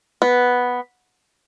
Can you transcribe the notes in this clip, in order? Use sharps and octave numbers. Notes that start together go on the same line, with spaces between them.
B3